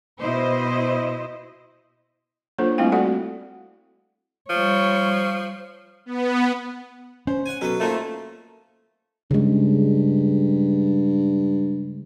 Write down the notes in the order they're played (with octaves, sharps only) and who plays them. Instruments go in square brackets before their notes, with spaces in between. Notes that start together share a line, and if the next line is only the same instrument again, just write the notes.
[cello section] B2 E4 C5 D#5
[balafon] F#3 A#3 D4 F4 A4 C5
G3 A3 C4 E4 F5 G5
F#4 A4 D5 F#5
[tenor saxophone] F3 [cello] G3 C#5
[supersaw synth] B3
[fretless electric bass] C#4 [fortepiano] C5
[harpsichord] F#5 G#5
[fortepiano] B2 F#3 [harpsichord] A4 B4
[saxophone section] A3 [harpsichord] A#3 C#4 [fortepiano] D#4 F4 C5
[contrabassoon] G2 [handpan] C#3 G#3